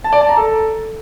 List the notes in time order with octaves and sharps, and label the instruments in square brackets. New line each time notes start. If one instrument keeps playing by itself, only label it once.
[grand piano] A5
D5
A5
A#5
A4